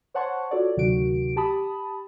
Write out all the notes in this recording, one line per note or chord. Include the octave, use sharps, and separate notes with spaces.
C5 C#5 F#5 A5 C6 C#6
F4 F#4 A4 C#5 D5
D2 C3 D#3 F#3 F#4 D7
G4 A5 B5 D#6